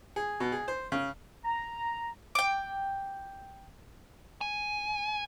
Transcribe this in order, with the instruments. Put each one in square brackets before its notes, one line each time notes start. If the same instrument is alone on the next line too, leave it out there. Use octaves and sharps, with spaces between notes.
[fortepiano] G#4
B2
G#4
C5
C#3
[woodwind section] A#5
[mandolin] G5 D6
[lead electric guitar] G#5